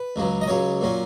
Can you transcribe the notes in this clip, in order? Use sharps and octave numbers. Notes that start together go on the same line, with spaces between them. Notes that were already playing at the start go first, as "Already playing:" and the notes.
Already playing: B4
C#2 C#3 F#3
D#5
C#2 C#3 F#3 C#5
A#2 F#3 C#4